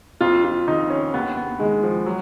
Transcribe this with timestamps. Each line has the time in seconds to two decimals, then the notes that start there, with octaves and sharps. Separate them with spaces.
0.21 F2 F4
0.44 F4
0.67 D#3 D#4
0.90 C#4
1.14 D#2 B3
1.37 B3
1.59 D#3 G#3
1.84 F3
2.06 F#3